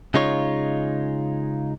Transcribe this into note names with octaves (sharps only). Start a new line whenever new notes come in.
C#3 G#3 D#4 F4 C#5